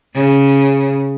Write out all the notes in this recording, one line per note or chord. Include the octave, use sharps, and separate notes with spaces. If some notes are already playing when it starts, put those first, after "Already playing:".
C#3